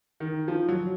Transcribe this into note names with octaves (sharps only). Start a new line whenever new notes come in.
D#3
F3
F#3